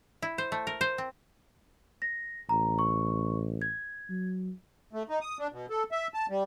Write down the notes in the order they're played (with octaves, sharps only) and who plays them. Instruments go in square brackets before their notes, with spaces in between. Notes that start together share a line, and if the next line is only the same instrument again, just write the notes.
[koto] E4
C5
A3
A#4
C5
C4
[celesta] A#6
[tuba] A1 [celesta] A#5
[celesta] C#6
G#6
[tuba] F#3
[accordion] A3
D#4
D#6
D4
B2
A4
E5
A5
G3